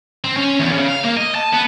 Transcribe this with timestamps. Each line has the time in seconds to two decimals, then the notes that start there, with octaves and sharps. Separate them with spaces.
0.24 C4
0.37 C#4
0.60 E2
0.72 C#3
0.88 F5
1.04 A#3
1.17 D#5
1.35 A5
1.53 B3